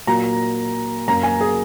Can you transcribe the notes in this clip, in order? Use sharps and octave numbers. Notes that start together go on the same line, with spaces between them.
A#2 F#3 A#3 A#5
F#2 F#3 A#3 A#5
G#5
G#4